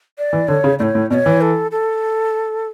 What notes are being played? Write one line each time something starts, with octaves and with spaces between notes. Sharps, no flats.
D5
E3
D3 C#5
C#3
A2 D5
C#5
A2
B2 D5
C#5
E3
A4
A4